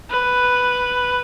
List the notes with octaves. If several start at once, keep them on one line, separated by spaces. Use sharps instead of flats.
B4